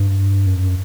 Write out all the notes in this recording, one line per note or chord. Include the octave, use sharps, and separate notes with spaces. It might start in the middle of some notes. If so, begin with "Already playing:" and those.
Already playing: G2
F#2